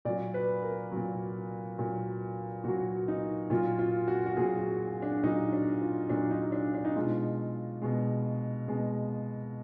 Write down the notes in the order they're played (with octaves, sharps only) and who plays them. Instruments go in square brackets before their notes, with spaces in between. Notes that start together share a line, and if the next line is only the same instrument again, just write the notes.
[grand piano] A#2 F#3 D5
B4
A#4
A#2 F#3
A#2 F#3
A#2 F#3 F#4
D#4
A#2 F#3 F4
F4
F#4
F#4
A#2 F#3 G#4
F#4
D4
A#2 F#3 D#4
D4
F4
A#2 F#3 D4
D#4
D4
D4
D#4
B2 G#3 F4
B2 G#3
B2 G#3